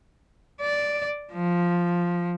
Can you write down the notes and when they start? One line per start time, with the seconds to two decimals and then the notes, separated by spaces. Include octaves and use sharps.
0.61 D5
1.32 F3